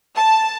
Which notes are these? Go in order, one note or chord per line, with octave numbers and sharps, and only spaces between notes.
A5